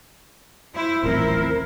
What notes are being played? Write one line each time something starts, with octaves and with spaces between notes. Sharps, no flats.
E4 C5
D#1 A1 F3 C4 E4 A#4